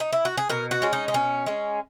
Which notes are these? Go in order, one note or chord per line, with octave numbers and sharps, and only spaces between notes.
D#4
E4
F#4
G#4
B2 A#4
F#4
G#3 C#4
D#4
D#4
B2 C#4
G#3 C#4